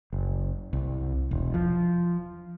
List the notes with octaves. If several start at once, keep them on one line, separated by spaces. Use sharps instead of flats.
F#1
C2
E1
F3